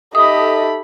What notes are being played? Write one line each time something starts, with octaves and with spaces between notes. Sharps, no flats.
D#4 G4 A4 D#5 E5 B5 D#6